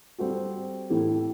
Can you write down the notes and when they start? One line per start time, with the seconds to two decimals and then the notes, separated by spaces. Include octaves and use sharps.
0.19 G3 C4 F#4 A4
0.90 A2 E3 A3 E4 G4